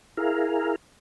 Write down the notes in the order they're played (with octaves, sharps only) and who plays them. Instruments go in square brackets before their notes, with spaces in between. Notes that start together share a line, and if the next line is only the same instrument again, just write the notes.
[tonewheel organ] E4 G#4 A#4 F5